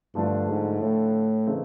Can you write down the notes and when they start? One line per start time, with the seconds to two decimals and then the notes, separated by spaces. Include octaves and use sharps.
0.15 G2 D3 F3 A3 D4 F4
0.48 G#2
0.80 A2
1.47 C#3 E3 A3 C4 D#4